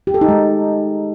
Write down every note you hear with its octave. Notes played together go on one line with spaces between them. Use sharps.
G4
A4
D#4
G#3